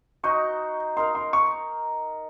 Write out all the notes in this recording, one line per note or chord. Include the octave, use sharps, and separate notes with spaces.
D#4 F#4 C5 D#5 C#6
D#4 A#4 F5 C6
C6
C#6